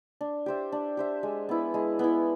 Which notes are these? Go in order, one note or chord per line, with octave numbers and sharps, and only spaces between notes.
D4
G4 C5 E5
D4
G4 C5 E5
G#3
B3 E4
G#3
B3 E4